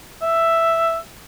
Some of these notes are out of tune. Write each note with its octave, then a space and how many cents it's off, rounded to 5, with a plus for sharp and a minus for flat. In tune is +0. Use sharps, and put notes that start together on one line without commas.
E5 +5